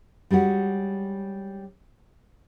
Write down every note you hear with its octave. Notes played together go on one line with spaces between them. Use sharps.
G3 G#3 C#4 F#4